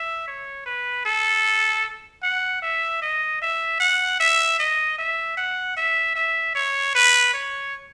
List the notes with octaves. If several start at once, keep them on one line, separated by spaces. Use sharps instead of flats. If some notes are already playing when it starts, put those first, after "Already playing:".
Already playing: E5
C#5
B4
A4
F#5
E5
D#5
E5
F#5
E5
D#5
E5
F#5
E5
E5
C#5
B4
C#5